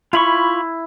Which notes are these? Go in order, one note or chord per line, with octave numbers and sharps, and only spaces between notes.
E4 F4 B5 C#6